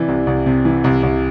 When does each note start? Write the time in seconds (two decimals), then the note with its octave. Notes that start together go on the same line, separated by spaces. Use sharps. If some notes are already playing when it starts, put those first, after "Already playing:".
Already playing: C3 E3 D5
0.08 C2
0.27 C2
0.46 C3
0.65 E3
0.84 C2
1.03 C2